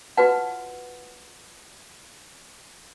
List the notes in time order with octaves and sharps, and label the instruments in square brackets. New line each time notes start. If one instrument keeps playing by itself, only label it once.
[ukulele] F4 C#5 A5 [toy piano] F#4 B4 F#5